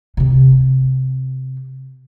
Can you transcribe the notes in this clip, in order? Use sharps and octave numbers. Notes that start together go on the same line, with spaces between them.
C3 C4